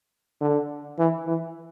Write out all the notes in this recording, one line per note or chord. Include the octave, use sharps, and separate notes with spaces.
D3
E3
E3